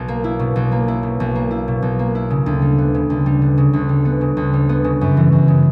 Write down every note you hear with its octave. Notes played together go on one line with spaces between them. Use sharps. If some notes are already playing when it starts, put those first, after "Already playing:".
Already playing: B1
A#3
E4
B2
B1
A#3
E4
B2
B1
A#3
E4
B2
B1
A#3
E4
C#3
D2
G3
B3
C#3
D2
G3
B3
C#3
D2
G3
B3
C#3
D2
G3
B3
C#3
F#2
E3
F#2
C#3